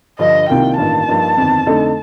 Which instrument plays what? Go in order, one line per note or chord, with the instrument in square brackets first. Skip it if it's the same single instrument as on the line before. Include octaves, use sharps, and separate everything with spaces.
[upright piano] G2 D3 F3 [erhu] D#5
[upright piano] C2 C3 D#3 A#3 F4 [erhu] G5
[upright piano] A1 G2 D#3 A#3 F4 [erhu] A5
[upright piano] G2 F3 A#3 D#4
G1 F2 D#3
F2 D3 A3 D#4 A4